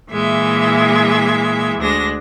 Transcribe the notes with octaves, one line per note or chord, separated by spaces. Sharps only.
A#2 E3 G#3 E5
D2 G#3 D4 A#6